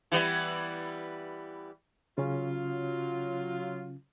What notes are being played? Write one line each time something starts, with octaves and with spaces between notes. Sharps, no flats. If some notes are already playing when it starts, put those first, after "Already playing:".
E3 G3 B3
C#3 F#3 C#4 F4